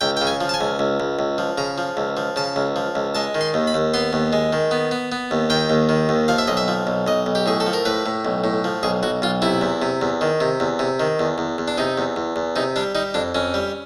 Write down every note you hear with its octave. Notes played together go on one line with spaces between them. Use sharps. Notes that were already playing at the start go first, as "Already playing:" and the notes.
C#2 G5
C#3 G5
G#5
F3
A5
G#5
C#2
C#2
C#2
C#2
F3
C#3 A#5
F3
C#2
F3
C#3 A5
C#2
F3
C#2
G#3 A5
D#3
C6
D#2
B5
D#2
B3 C6
D#2
G#3
D#3
B3
B3
B3
D#2
D#3 G5
D#2
D#3
D#2
F3 F5
E5
B1 D#5
E5
F3
B1
B1 D#5
B1
G4
A2 G#4
A4
F3
A#4
A2 B4
A2
B1
A2
F3
B1 G#4
B1 F#4
B1 F4
C3 E4
E2
C3
E2
D#3
C3
E2
C3
D#3
E2
E2
E2
D4
C3 D#4
E2
E2
E2
C3 D#4
G3 D4
G3 D#4
F2 D4
F2 C#4
G3